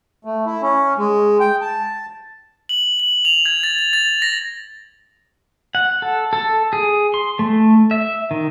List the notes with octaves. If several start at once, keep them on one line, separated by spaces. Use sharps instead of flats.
A3
E4
C#4
G#3
G5
A5
F#7
F#7
F7
G#6
A6
A6
A6
A#6
F#5
A4
A4
G#4
C6
A3
E5
D#3